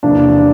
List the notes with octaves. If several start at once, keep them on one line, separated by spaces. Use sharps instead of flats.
E2 C3 F3 A#3 D4